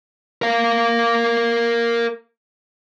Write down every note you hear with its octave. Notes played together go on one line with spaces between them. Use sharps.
A#4 F5